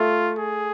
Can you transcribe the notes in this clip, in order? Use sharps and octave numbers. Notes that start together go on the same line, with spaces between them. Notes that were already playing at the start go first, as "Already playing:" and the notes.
Already playing: A3 F4
G#4